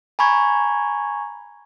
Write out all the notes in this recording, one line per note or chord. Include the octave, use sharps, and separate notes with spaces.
G#5 A#5 B5 C#6 G#6